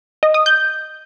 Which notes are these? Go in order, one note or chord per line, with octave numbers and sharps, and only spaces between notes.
D#5
D#6
G6